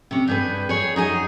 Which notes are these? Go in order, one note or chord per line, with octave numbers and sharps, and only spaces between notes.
C3 C#4
G2 G#4 B4 G5
G#4 C#5
F#2 D#4 G#4 G#5